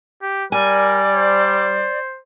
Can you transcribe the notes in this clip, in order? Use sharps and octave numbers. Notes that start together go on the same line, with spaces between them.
G4
G3 A#4 D5 G#5
C5